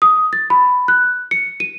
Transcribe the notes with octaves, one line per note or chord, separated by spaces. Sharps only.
D#6
A6
B5
F#6
C#7
D#7